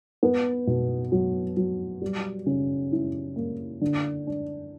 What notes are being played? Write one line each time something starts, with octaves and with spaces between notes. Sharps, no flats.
B3
B2
F#3
F#3
G3
C#3
E4
A#3
D3
D4